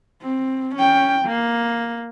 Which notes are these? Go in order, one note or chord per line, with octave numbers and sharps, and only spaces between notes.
C4
C#4 G5
A#3